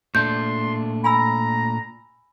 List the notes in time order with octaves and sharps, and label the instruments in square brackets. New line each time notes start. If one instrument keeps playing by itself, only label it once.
[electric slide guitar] A#2 A3 D4 [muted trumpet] C6 [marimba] G6
[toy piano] G#5 B5 E6 [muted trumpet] A#5